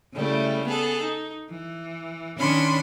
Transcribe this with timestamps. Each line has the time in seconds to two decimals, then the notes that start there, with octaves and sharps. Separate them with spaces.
0.13 C#3 G3 A3 E4
0.64 B3 G#4 A4
1.02 D#4
1.49 E3
2.37 D#3 C#4 D4 B5 C6